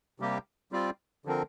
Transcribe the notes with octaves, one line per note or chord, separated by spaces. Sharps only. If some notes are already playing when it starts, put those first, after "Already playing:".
C3 G3 A#3 G4
G3 C4 F4 D5
D3 F3 C4 A#4